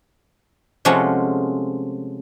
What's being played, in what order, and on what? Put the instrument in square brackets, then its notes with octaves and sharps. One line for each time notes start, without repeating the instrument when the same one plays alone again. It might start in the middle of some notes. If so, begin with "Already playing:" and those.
[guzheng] C3 F3 G#3 A3 C#4 F#4